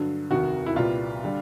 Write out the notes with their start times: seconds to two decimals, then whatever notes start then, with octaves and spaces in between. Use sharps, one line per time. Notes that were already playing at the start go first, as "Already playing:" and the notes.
Already playing: G2 D3 F#3
0.30 F1 D#2 D#3 F#4
0.66 E4
0.76 C2 A#2 G3 B3 F4
1.24 D3 G3